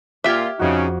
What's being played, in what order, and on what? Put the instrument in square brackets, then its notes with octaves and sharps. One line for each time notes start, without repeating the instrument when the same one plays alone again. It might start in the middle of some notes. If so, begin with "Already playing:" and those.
[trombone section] A#2 F4 [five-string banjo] G4 E5 [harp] D6 F6 G#6
[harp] F2 F#4 [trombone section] C#3 D#4